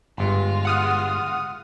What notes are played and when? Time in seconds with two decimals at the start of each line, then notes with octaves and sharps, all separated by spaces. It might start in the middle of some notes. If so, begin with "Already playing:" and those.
0.18 G1 G2 G#3 F4
0.65 F#5 D#6 F6